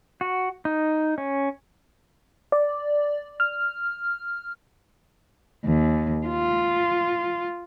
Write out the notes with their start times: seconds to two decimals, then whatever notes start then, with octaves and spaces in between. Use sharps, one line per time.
0.21 F#4
0.65 D#4
1.18 C#4
2.52 D5
3.40 F6
5.66 D#2
6.27 F4